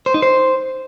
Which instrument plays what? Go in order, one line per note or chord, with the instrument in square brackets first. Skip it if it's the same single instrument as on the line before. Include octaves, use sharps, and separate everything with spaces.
[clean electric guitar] C5
D#4
C5